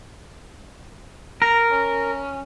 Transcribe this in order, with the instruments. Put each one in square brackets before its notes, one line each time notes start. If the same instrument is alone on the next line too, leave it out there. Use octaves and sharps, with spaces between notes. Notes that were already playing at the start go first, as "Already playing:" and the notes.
[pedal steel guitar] A#4 [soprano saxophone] A#5
[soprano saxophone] C#4